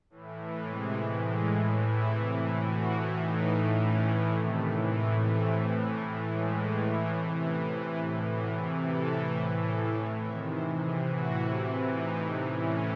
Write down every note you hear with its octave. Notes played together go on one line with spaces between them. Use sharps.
A2 E3
A2
E3
C3 E3 G#3
A2 E3
A2 E3 G#3
A2 E3
A2 E3 E4
C3 E3
A2 E3
A2 E3 F#4
A2 E3
A2 E3 D#4
A2 E3
A2 E3 C#4
A2 E3
C3 D#3 A3
A2 E3
A2 E3 G#3
C3 E3 A3
A2 E3
A2 E3
A2 E3
A2 E3 G#3
A2 E3
A2 E3
C3 E3
A2 E3 C#4
C3 E3 E4
A2 E3
A2 E3 F#4
C3 E3 G#4
C3 E3 A4
A2 E3
A2 E3
A2 E3 A4
A2 E3 C#5
C3 D#3 E5
C3 E3 C5
C3 E3 G#4
A2 E3 F#4
C3 E3
C3 E3 E4
A2 E3 D#4
C3 E3
A2 E3 C#4